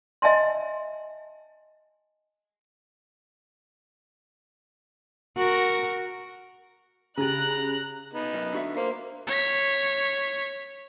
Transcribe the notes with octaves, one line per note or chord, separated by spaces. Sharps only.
D#5 E5 G#5 A5 C6
F#4 A#4
C#3 G4 G#4 A#5 F#6 A6
B3 D#4
F#2
D3 F#4 E5
A#3 C5
C#5 B6